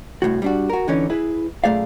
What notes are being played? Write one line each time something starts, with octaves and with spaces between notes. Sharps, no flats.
C2 A2 C3 F#4
G3 D4 F#4
F#4 A#4
D3 E3 C#4 D#4
E4 G#4 B4
F#2 A#2 A3 G#4 D5 F5